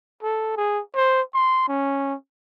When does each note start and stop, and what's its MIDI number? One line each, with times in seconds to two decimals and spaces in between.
0.23 0.52 69
0.57 0.81 68
0.95 1.22 72
1.34 1.68 84
1.68 2.15 61